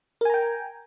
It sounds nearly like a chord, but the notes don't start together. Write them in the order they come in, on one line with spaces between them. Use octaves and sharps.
A#4 G#5 A#5 G5